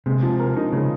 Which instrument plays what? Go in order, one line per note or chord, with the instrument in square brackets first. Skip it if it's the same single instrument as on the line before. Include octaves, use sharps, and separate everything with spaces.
[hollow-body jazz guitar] C3 [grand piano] G#3
[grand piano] F3
A#4
D#4
[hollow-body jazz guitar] C#3 [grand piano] G#3